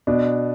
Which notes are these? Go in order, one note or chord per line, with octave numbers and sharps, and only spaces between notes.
B2 D4